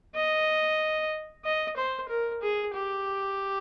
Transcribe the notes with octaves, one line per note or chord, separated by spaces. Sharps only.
D#5
D#5
C5
A#4
G#4
G4